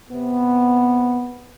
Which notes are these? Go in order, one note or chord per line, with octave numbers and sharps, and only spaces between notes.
C3 B3